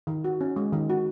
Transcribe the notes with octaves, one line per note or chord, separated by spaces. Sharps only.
D#3
F#4
C#4
G#3
D#3
F#4